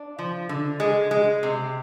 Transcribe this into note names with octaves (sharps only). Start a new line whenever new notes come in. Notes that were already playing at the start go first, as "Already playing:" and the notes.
Already playing: D4
F3
D3
G#3
G#3
C3